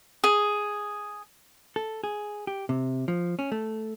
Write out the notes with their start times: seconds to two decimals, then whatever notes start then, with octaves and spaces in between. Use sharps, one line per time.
0.24 G#4
1.76 A4
2.04 G#4
2.47 G4
2.69 C3
3.08 F3
3.39 C#4
3.52 A3